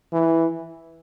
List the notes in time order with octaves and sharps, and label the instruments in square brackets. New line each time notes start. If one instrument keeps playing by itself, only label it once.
[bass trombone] E3